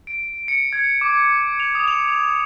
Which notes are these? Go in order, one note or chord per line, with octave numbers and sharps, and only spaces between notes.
D7
C#7
G#6
D6
F7
D#6
F7